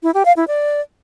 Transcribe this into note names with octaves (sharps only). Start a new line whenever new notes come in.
E4
G4
F5
E4
D5